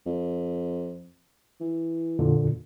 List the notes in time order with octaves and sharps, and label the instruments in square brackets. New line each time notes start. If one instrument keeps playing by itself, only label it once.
[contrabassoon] F2
E3
[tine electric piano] F2 A#2 D3